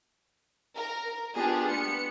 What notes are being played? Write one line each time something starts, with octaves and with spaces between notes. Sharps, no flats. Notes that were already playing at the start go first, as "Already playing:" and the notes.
A#4
B3 D4 F4 G4 G#4
B3 C#7